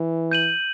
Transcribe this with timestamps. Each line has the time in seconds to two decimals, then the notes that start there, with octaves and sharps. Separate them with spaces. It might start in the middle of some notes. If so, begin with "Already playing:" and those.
Already playing: E3
0.31 G6 D#7 F#7